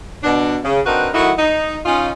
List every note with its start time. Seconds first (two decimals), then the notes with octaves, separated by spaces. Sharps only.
0.23 B2 D4
0.64 C#3
0.85 C4 D4 D#4 F#4 A#4 B4
1.13 D#3 F#3 A3 D#4 E4 F#4
1.39 D#4
1.86 C#4 D#4 F4